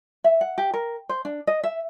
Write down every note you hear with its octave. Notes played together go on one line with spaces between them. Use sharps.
E5
F#5
G4
A#4
C5
D4
D#5
E5